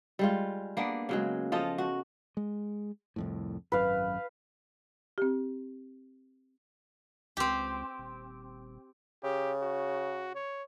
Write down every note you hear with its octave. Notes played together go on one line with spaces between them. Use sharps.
G3 G#3 F4
A#3 B3 D4
C#3 F#3 G#3
F3 F4 A4 D#5
F#4
G#3
C2 F2 A2
G#1 F#2 B4 F5
C4 G4
C#2 C4 G4
D#1
C#3 G4
F#4
C#5